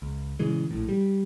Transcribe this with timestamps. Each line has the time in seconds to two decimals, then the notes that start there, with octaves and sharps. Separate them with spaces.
0.02 C#2
0.39 A#2 C#3 E3 G#3
0.71 A#1 A2
0.89 G3